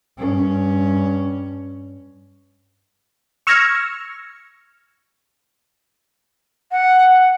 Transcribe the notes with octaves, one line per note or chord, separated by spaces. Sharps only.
G2 C#4
C#6 E6 F6 G#6 A#6 C#7
F#5